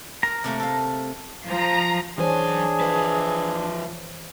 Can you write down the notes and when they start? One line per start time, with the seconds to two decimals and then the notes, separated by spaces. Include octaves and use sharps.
0.23 A#4 A#5
0.44 C3 A3 A#3
0.60 A4 F5
1.47 F3 A#5
2.18 F#2 E3 D4 G#4 C5 C#5 G#5
2.80 F3 B4